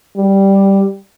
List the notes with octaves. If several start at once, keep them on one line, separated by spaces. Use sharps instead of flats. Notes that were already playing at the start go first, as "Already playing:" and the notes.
G3